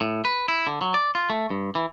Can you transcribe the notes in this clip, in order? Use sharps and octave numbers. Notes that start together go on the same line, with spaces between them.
A2
B4
E4
D3
F#3
D5
F4
A3
G2
E3